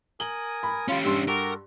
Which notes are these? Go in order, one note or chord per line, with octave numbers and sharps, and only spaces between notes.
A#4 G#5 D#6 F#7
B5
C#4 F4 G4
G2 C6 E6
F#4 G4 A4 A#4